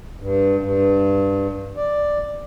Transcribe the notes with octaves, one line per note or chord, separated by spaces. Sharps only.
G2
G2
D5